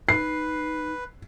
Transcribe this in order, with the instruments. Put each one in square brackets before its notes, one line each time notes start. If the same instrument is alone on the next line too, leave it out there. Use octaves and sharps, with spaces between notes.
[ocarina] D#4 [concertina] B4 [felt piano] C7